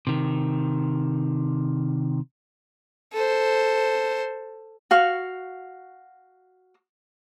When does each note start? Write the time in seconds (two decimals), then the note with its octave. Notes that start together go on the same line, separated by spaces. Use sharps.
0.07 C3 D#3
3.13 A4 C5
4.91 F#4 F5 C#6